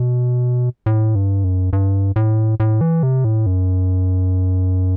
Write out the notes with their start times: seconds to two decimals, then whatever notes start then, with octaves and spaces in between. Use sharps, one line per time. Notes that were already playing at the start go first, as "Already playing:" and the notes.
Already playing: B2
0.86 A2
1.15 G2
1.44 F#2
1.73 G2
2.16 A2
2.60 A2
2.81 E3
3.03 C3
3.24 A2
3.46 F#2